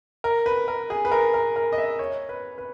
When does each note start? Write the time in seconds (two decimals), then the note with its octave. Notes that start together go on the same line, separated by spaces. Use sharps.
0.24 A#4
0.46 B4
0.68 A#4
0.90 G#4
1.05 B4
1.12 A#4
1.34 A#4
1.56 A#4
1.72 D#5
1.78 E5
1.99 C#5
2.29 B4
2.58 B4